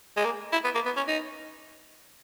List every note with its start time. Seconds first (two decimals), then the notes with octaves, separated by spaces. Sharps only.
0.17 G#3
0.25 A#3
0.53 E4
0.64 B3
0.75 A#3
0.86 B3
0.97 C#4
1.08 D#4